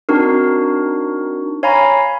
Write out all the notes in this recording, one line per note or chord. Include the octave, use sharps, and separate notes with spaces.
C4 D4 D#4 F#4 A#4
C#5 F5 G#5 A#5 B5